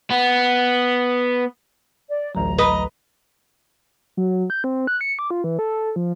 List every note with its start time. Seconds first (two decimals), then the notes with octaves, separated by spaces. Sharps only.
0.10 B3
2.10 D5
2.35 A1 D2 F#3 A#5
2.59 B4 D#5
4.17 F#3
4.50 G6
4.64 C4
4.87 F#6
5.01 C#7
5.19 D6
5.30 F4
5.44 E3
5.59 A4
5.96 F3